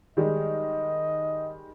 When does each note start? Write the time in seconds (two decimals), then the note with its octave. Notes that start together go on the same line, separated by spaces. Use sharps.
0.17 D#3 G3 G#3 D#5